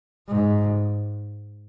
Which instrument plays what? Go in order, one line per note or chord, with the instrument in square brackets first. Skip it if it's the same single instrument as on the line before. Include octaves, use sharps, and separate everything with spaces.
[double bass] G#2